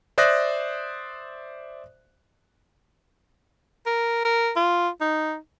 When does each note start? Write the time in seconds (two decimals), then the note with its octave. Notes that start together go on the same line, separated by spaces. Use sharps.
0.18 C5 D5 E5 D#6 F#6 A#6
3.86 A#4
4.25 A#4
4.56 F4
5.01 D#4